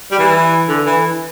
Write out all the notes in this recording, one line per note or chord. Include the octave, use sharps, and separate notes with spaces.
G3
E3
D3
E3